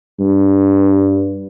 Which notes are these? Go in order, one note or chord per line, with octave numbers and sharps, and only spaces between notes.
G2